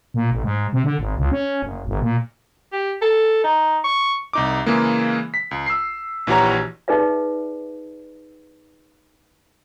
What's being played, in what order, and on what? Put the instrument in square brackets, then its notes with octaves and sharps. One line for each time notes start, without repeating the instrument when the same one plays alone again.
[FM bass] A#2
A1
G#2
C3
D3
G#1
C#2
C#4
F#1
G1
A#2
[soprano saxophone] G4
A4
D#4
C#6
[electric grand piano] C2 D#4 D6
C#3 E3 G#3 A#3
B6
C#2
E6 C7
A#1 E3 F#4 G4 C#5 A#5
[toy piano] D#4 G#4 B4 D5 E5